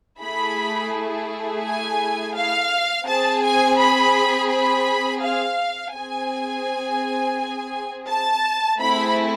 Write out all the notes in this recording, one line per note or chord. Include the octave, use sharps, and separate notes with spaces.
A3 E4 G#4 B5
G#5
F5
C4 G#4 A5
G#5
B5
B5
F5
C4 G#4 G#5
A5
A3 C4 E4 G#4 B5